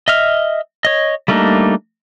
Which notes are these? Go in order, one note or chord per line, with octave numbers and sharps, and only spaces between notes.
D#5 E5 F6
C#5 D#5
G3 A3 A#3 D4 D#4